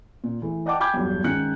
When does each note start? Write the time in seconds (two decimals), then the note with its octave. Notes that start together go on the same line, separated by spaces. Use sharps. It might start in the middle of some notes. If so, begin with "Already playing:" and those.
0.24 A#2
0.42 E3 A3
0.66 D5 D#5 F#5 G5 A5 D6
0.80 G5 G#5 B5 D6 G6 G#6
0.94 B1 E2 G2
1.24 G#2 D#3 C#4 F#6 C#7